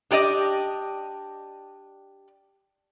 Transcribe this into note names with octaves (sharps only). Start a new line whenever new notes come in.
D4 G4 D5 D#5